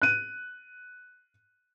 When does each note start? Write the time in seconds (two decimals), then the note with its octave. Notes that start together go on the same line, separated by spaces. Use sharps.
0.02 F#6 D#7